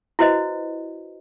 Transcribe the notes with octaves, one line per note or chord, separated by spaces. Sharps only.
E4 F#4 B4 C5 D#5